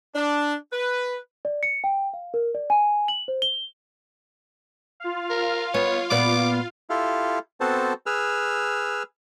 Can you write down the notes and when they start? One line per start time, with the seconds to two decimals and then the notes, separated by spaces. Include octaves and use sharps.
0.15 D4
0.72 B4
1.45 D5
1.63 C#7
1.84 G5
2.14 F5
2.34 A#4
2.55 D5
2.70 G#5
3.08 F#7
3.28 C5
3.42 G7
5.00 F4 F5
5.30 A#4
5.74 B3 C#5
6.10 A#2 B3 D5 D6
6.90 E4 F4 G4 A4 F5
7.61 B3 C4 F#4 A4 C5 A5
8.06 G#4 B4 E6 F6